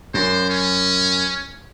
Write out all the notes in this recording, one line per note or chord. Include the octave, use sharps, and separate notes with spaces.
F#2 C5
C#4